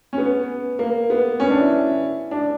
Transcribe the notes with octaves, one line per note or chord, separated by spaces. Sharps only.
C#4
B3
A#3
B3
C#4
D4
E4
D4